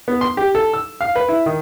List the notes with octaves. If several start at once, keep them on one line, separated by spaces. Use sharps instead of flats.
B3
C6
G4
A4
E6
F5
B4
E4
D#3